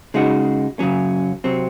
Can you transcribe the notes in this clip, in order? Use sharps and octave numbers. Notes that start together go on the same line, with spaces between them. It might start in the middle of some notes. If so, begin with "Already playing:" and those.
C#3 G#3 D#4 F#4
F#2 C#3 F#3 C#4
C3 F#3 C4